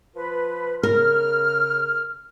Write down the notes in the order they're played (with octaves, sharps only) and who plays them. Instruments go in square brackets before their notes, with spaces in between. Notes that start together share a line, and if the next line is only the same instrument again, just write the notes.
[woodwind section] F3 F4 B4
[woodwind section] C#3 F6 [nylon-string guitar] A#4